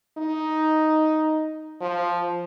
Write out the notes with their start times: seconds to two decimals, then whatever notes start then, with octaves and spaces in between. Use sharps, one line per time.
0.18 D#4
1.81 F3